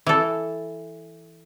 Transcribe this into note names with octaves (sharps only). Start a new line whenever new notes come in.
E3 A4